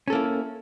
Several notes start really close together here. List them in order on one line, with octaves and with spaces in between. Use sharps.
C#4 A4 A#3 E4